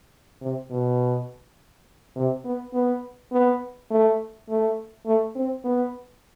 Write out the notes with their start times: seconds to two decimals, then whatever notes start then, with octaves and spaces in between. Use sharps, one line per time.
0.41 C3
0.71 B2
2.16 C3
2.45 B3
2.74 B3
3.32 B3
3.90 A3
4.49 A3
5.06 A3
5.35 C4
5.64 B3